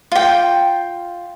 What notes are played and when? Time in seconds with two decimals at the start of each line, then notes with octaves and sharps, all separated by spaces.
0.12 F4 G5